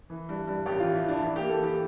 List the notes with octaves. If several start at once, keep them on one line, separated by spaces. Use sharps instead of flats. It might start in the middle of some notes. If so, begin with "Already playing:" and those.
E3
G2
G2
A1 G4
F4
E3
E4
E3
D4
E3 E4
G4
A#3
A4
E3 G4